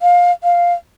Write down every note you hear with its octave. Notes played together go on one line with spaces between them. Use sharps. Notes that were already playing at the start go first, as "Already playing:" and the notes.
F5
F5